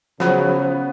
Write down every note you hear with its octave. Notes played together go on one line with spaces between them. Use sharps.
C#3 F3 F#3 B3 C5